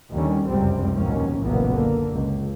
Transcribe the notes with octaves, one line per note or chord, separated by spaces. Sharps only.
D#2 D3 D#3 G3 C#4
F1 C#2 F#2 C3 G3 C4
A#1 D#2 B2 D#3 A#3 C#4
F#1 B1 A#2 E3 A#3 B3
D3 A#3
C#2